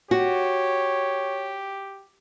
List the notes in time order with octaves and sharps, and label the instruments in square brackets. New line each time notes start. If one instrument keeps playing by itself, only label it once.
[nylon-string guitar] F#4 [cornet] G4 [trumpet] C#5